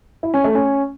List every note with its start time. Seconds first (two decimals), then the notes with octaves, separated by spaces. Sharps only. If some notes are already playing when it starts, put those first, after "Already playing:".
0.23 E4
0.34 C#4
0.44 A3
0.55 C#4